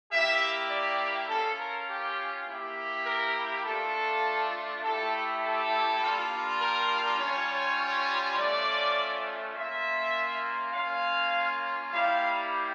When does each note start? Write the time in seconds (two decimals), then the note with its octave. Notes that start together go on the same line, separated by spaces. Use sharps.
0.11 A#3 E4 G4 E5
0.70 D5
1.29 C#4 F4 A4
1.58 A#4
1.88 G4
2.47 A#3 E4 G4
3.05 A#4
3.65 A3 D4 F4 A4
4.83 A3 E4 G4 A4
5.42 A4
6.01 G3 A#3 D4 F4
6.60 A#4
7.19 G3 C#4 F4 C#5
8.37 A3 C#4 F4 D5
9.55 A#3 C#4 F4 E5
10.73 A#3 C#4 F4 F5
11.91 G3 A#3 E4 G4 F5